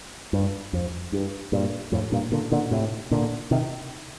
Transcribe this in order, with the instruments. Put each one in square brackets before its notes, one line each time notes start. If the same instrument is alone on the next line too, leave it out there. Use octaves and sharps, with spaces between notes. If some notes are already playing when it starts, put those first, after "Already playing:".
[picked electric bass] G2
F2
G2
G2 A#2
F2 A2
G2 A#2
A#2 D3
A#2 D3
A2 C3
A#2 D3
C3 D#3